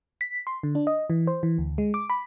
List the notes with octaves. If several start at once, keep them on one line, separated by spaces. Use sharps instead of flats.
B6
C6
D3
D4
D#5
E3
C5
E3
D2
G#3
D6
B5